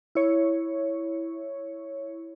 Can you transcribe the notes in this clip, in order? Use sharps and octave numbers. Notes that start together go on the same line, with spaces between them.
E4 C#5